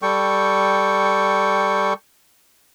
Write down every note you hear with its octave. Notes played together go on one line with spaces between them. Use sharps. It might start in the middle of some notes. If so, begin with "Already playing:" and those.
G3 A4 G5 C#6